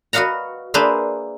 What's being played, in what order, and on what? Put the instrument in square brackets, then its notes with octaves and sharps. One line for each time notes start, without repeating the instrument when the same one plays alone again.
[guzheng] F#4 B4 D#5 F5 F#5 A#5
A#3 D4 G#4 B4 C5 E5